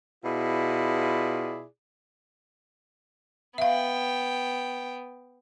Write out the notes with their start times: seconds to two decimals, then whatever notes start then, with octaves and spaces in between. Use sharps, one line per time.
0.24 B2 E4 F4 G#4 D5
3.58 B3 E5 F5 G5